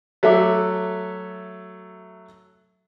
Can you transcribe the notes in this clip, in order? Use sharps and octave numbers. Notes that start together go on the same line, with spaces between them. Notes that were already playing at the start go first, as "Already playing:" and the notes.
F#3 A3 A4 E5 D6